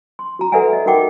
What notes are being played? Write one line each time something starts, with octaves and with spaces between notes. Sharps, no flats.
C6
F#4 A#5
A4 B4 D5 E5 F#5 G#5
D#5
D#4 F#4 A#4 F#5 G5 D6